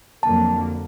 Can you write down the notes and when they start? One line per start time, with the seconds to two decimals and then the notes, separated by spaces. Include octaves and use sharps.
0.23 F2 D3 F#3 A#3 A5